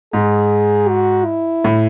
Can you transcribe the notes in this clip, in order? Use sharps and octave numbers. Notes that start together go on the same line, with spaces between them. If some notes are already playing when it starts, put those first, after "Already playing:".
G#2 G#4
F#4
E4
A2